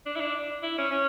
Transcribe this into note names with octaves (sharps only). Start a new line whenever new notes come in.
D4
E4
D4
E4
C#4
C#4